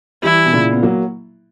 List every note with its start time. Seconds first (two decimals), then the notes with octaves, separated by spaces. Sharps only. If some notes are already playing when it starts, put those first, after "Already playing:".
0.23 E3 G3 E4
0.46 B2
0.53 A#2 C#3
0.73 B3
0.83 F#3 A#3